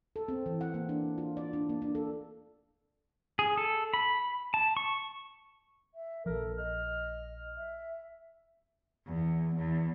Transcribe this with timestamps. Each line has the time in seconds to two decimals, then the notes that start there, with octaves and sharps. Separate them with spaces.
0.16 A4
0.28 C4
0.46 E3
0.61 F#5
0.74 A#3
0.89 D4
1.18 F4
1.37 D5
1.53 D4
1.69 A#3
1.82 D4
1.95 A4
3.39 G#4
3.58 A4
3.94 B5
4.54 A5
4.77 C#6
5.94 E5
6.26 A#1 F3 A4 A#4
6.57 D#5 F6
7.56 E5
9.07 E2
9.56 E2